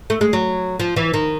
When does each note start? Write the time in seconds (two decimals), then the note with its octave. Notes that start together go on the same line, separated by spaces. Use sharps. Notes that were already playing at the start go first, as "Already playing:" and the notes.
0.10 A3
0.21 G#3
0.33 F#3
0.80 F3
0.96 E3
1.14 D#3